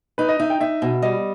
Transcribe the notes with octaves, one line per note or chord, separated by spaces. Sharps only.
D#4 B4
D#5
D#4 E5
G5
D#4 E5
B2
G3 D#5